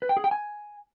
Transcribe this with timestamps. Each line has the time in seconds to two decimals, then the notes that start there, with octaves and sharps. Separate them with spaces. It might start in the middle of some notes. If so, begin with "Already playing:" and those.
0.02 B4
0.09 G5
0.17 G#4
0.24 G5
0.31 G#5